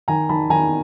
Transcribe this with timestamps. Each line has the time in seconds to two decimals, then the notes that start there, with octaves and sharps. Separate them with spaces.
0.08 D#3 G#5 A#5
0.29 D#3 A5 B5
0.50 D#3 G#5 A#5